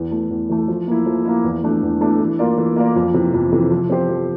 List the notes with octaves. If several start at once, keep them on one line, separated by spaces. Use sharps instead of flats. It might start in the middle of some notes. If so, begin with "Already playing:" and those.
Already playing: E2
E3 A3
E2
E3 A3
F3
A#3 E4
F3
A#3 E4
E2
E3 A3 D4
E2
E3 A3 D4
E3
A#3 F4 A#4 D5
E3
A#3 F4 A#4 D5
F2
C3 E3
F2
C3 E3
F3
C4 G4 C5
F3